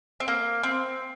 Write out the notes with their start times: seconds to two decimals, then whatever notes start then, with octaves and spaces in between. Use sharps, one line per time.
0.20 C4
0.28 A#3
0.63 C4